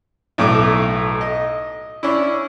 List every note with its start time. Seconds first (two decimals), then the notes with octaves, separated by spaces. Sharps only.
0.38 B1 A2 A3 D6
1.21 D#5
2.03 C#4 D4 E4